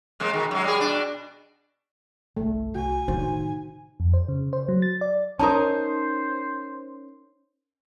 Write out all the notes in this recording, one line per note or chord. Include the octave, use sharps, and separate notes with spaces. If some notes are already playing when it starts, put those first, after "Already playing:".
C3 G#3 A#3
B2 D#3
F#2 G#3
G3 G#4
B2 D4
G1 C2 A3
C2 F#4 G#5
A2 C3 D#3 D#4 F#4 C5
F2
C5
C#3
C5
F#3
A6
D5
C#4 D#4 A#4 C5 A5 A#5 D#6